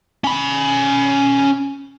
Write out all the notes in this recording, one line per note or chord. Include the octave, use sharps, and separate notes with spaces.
C#4 B5